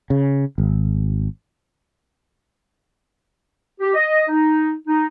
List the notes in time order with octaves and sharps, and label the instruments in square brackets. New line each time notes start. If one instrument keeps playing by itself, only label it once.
[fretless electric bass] C#3
G#1
[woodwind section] G4
D#5
D#4
D#4